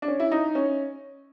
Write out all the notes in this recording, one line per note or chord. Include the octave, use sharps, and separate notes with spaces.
D4
C#4
E4
D#4
C#4